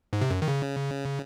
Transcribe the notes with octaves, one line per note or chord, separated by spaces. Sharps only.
G#2
C3
F#2
D#3
C#3